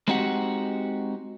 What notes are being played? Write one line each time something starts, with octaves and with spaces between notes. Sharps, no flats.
G#3 C4 D#4 F#4 G4 F#5